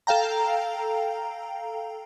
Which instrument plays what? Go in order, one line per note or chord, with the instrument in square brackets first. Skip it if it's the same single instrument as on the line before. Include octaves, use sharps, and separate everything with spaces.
[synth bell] A4 F5 G5 A#5